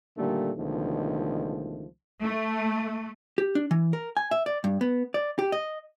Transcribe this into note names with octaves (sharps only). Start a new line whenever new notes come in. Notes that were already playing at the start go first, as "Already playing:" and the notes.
A#2 D3 D#3 G3 A3 A#3
C#2 B2 D3 D#3 F3 A3
A3
G4
D4
E3
A#4
G#5
E5
D5
G2
B3
D5
G4
D#5